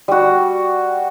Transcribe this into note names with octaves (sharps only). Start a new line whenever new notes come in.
G3 F#4